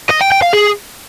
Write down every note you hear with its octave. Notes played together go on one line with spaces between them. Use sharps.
D#5
G5
G5
F5
G#4